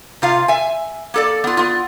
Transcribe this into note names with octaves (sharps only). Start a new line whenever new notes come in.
C3 F4 F5
E5 G#5
A#3 A4 D5
B3 F4
B3 F4